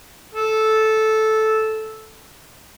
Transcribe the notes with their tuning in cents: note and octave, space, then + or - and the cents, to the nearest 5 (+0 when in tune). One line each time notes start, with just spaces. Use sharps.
A4 -10